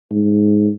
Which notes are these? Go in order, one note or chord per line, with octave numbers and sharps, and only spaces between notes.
G#2